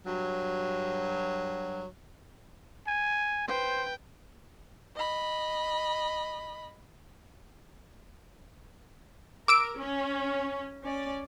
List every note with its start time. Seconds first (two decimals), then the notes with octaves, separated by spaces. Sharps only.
0.06 G2 F#3
2.87 G#5
3.48 B4 C5 G5
4.96 D#5 B5
9.48 A#4 D6 E6 D7
9.78 C#4
10.86 C#4 D5